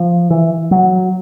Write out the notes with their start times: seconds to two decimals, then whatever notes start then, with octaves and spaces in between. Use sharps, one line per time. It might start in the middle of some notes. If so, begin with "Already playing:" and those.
Already playing: F3
0.30 E3
0.71 F#3